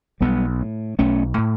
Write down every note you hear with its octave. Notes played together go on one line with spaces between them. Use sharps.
B1 G3 B3
A2
B1 A3 C#4
A2